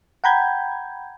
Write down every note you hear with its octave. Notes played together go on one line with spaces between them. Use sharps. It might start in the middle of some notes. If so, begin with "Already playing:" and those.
F#5 G5 A#5 B5 G6 G#6